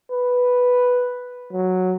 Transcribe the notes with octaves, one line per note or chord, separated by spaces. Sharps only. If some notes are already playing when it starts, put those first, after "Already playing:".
B4
F#3